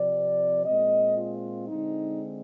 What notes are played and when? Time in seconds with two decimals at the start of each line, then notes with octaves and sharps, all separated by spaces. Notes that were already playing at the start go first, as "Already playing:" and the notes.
Already playing: C3 F3 C4 D5
0.65 A#2 G#3 C4 D#5
1.17 F4
1.68 D3 G#3 C4 D#4